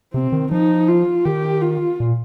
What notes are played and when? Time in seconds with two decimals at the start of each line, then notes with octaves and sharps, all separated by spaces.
0.14 C3 C4
0.32 D#3
0.51 F3 D#4
0.88 F4
1.25 D#3 G4
1.62 F4
2.00 A#2